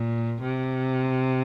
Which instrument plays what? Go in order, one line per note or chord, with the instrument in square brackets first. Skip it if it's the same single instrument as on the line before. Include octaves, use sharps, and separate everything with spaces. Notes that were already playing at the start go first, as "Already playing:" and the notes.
Already playing: [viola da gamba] A#2
C3